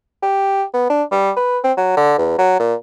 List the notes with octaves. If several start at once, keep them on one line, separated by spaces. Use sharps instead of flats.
G4
B3
D4
G3
B4
C4
F#3
D3
E2
F#3
A#2